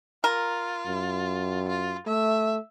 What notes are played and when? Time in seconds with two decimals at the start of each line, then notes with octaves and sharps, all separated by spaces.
0.24 F4 A#4
0.87 F#2
1.69 F4
2.07 A3 E5